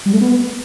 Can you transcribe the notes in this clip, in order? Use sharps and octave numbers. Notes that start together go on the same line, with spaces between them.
G3
A3
B3